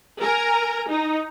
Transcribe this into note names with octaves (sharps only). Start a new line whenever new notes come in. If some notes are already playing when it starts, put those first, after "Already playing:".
A#4 G#5 A#5
D#4